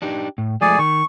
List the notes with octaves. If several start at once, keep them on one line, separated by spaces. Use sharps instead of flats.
D4 D#4 G4
A2
F3 G#3 A3 G#4 D5 G#5
D#3 C#6